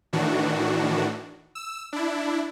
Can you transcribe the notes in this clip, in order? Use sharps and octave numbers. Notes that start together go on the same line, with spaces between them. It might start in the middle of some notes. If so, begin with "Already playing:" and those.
A2 D#3 E3 D4 F#4
E6
D4 E4